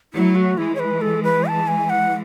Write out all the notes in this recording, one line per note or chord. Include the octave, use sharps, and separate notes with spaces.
F#3 A3 E4
F#4
E3 G#3 E4
C#5
B4
A4
B4
A5
G#5
F#5